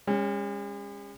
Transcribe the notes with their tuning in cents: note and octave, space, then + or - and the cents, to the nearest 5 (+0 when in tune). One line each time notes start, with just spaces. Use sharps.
G#3 -45 C#4 +0